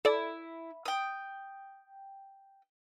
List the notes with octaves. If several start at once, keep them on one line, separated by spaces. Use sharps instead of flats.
E4 A4 D5
G5 D#6